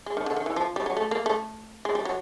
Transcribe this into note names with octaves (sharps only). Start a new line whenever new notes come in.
G#3
D#3
D3
D#3
E3
F3
G3
F#3
A3
A#3
A3
G#3
G3
F#3